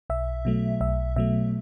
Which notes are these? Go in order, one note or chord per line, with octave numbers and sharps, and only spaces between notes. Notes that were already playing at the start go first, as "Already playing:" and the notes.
B1 E5
B2 F#3 A3
B1 E5
B2 F#3 A3 E5